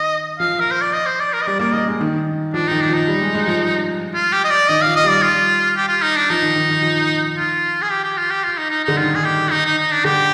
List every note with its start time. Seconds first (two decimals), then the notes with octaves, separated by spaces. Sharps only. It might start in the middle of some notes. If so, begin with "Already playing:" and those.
Already playing: D#3 D#5
0.39 F3 F5
0.60 A#4
0.71 C5
0.82 D5
0.93 D#5
1.06 C5
1.20 D5
1.33 A#4
1.42 D#5
1.47 G3 D5
1.59 A#3 D5
1.73 A#3 D#5
1.87 G#3
2.01 D#3
2.53 F3 D4
2.68 D#3 D#4
2.81 D4
2.89 F3 D#4
3.08 G3
3.21 G#3
3.35 G#3
3.47 F3
4.15 F4
4.32 G4
4.45 D#5
4.50 D5
4.68 D#3 D#5
4.82 F3 F5
4.96 D#5
5.04 G3 D5
5.23 F4
5.76 G4
5.89 F4
6.02 D#4
6.16 D4
6.30 F3 D#4
6.42 D#3
6.56 D#3
6.69 D#3
6.83 F3
7.37 F4
7.82 G#4
7.90 G4
8.04 G4
8.17 F4
8.31 G4
8.44 F4
8.58 D#4
8.70 D#4
8.85 D3 D#4
8.97 D#3 F4
9.15 G#4
9.24 G4
9.51 D#4
9.65 D#4
9.78 D#4
9.92 D4
10.05 D3 G4